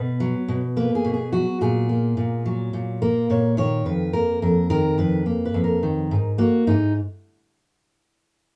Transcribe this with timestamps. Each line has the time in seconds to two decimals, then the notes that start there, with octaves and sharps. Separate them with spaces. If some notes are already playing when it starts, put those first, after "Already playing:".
Already playing: B2 B4
0.20 F#3
0.48 B2
0.77 A#3 B4
0.95 G#4
1.05 B2
1.14 G#4
1.32 F#3 F#4
1.61 A#2 G#4
1.89 A#3
2.17 A#2
2.46 F#3
2.73 A#2
3.02 A#3 A#4
3.30 A#2 C#5
3.57 D#3 C#5
3.86 F2 B4
4.13 A#3 A#4
4.42 F2 A#4
4.70 D#3 A#4
4.98 F2 B4
5.26 A#3
5.45 B4
5.54 F2
5.64 A#4
5.83 D#3
6.11 G#2
6.38 A#3 F#4
6.67 G#2 D#4